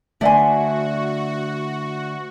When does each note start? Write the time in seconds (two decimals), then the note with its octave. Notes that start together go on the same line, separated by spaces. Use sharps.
0.21 D3 A3 E4 F#4 D5 F#5 G#5 C6